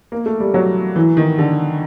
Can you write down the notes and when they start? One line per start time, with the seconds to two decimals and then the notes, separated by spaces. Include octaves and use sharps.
0.12 A#3
0.26 A3
0.40 G3
0.54 F#3
0.96 E3
1.17 D#3
1.39 D3